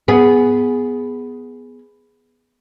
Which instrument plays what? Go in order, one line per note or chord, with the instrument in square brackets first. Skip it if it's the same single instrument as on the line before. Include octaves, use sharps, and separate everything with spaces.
[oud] B3 G#4